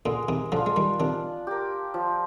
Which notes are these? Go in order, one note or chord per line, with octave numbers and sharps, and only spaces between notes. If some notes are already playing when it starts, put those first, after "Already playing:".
A#2 D3 G#3
C3 D#3
D3 F3 D4 F4
G#3
D#3 G3
C3 D#3 D4
G4 A#4
F3